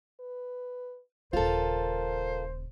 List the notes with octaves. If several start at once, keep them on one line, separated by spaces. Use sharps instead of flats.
B4
D#1 C#3 F4 A4 A#4 C5